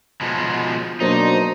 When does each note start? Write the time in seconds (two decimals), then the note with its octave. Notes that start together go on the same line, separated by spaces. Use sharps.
0.21 B2 F3 G#3
1.00 B2 F#3 A#3 D4 D#4 C5